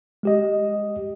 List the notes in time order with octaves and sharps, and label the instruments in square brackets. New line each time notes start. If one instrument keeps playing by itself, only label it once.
[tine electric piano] G#3 G4 D#5